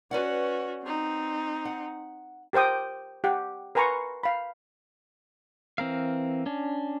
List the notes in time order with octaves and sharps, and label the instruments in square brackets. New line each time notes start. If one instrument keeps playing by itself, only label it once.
[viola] C#4 F#4 [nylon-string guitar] B4 D5 F#5
[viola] C4 D#4
[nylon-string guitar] F#5
[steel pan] G4 A#4 C5 G5 D#6
G4 F#5
A#4 B4 G#5 A#5 C6 C#6
F5 B5
[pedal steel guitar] E3 C4 A#4 F5
C#4 D4